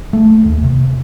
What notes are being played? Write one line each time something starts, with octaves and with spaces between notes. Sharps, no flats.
A3
D#2
C3